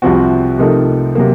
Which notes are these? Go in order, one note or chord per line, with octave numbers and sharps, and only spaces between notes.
C2 C3 F3 C4 F#4
C3 F3 A3 D#4 A#4
C3 F#3 A#3